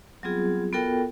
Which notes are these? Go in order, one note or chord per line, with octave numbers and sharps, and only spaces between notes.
F#3 G3 B3 C4 F4 G#4
B3 F4 F#4 A4 A#4 G5